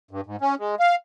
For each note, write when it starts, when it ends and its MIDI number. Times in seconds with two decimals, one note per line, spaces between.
0.11 0.21 43
0.26 0.36 44
0.41 0.55 61
0.59 0.75 56
0.80 0.95 77